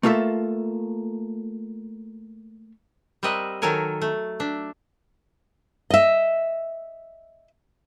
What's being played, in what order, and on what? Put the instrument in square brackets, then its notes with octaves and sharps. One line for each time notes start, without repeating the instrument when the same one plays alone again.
[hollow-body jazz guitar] A3 A#3 F4 A4 E5
[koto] G3 C4 A#4 D#5 E5 F#5
D#3 F#3 A4 A#4 C#5 G#5
A3
D4 E5
[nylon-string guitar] D#5 E5